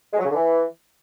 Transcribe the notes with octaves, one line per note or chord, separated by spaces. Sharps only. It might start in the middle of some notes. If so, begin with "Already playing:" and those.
G#3
F#3
C#3
D3
E3